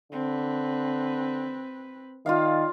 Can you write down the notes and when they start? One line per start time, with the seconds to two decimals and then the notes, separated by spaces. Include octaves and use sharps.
0.12 D3 C4 B4
2.26 D#3 F4 D5 F5